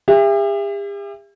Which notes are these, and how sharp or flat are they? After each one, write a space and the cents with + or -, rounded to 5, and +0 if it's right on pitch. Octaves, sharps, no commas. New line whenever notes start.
G4 +45 E5 +25